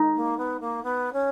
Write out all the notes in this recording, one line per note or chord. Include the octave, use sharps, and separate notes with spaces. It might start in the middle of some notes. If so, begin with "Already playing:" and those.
Already playing: D#4
A#3
B3
A#3
B3
C#4